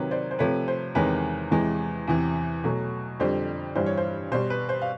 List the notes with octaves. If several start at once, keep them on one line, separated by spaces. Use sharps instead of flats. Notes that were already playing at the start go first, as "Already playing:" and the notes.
Already playing: C3 D#3 F#3 B4 C#5
C5 D5
C5
C3 F3 A3 B4 C#5
C5
E2 C3 D#3 G#3 B4 C#5
E2 C3 E3 G#3
E2 C3 E3
B2 F#3 A3
F2 D3 G3 C5
G2 E3 G3 C5
C#5
C5
B2 G3 C5
B4
C5
F5